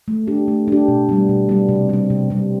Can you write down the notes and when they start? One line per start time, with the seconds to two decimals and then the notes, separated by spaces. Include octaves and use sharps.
0.08 A3
0.27 D4 G4
0.48 A3
0.68 D4 G4
0.88 B2
1.09 G3 B3
1.29 B2
1.49 G3 B3
1.69 C3
1.89 G3 C4
2.10 C3
2.30 G3 C4